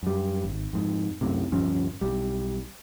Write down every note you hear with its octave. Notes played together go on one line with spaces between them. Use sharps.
F#2 G3
G#1
F2 G#2
C2 F#2 A2 C3
D1 G2 F3 C#4
B1 G3